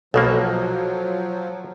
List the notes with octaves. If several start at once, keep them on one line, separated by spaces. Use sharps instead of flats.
B1 B2 F3 F#3 A#3 F#4 A4